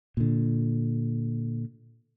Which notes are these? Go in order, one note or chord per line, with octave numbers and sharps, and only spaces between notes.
A#2 D3